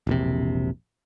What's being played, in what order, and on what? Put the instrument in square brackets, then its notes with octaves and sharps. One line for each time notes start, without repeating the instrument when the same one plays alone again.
[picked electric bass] E1 A#1 C3